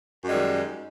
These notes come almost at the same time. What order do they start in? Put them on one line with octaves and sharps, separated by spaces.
F#2 G#3 G3 D#3